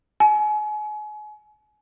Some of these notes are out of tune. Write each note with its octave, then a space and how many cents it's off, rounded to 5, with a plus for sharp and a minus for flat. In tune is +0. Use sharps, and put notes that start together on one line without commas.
G#5 +35